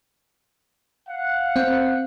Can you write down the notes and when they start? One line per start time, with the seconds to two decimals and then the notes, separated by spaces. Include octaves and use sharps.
1.09 F5 F#5
1.56 C4